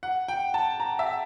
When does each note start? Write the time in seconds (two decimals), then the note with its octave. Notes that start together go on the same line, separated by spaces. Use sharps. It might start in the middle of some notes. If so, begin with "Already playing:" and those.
0.03 F#5
0.28 G5
0.54 A5
0.80 A#5
0.99 E5